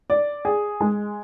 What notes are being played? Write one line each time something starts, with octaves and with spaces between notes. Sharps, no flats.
D5
G#4
G#3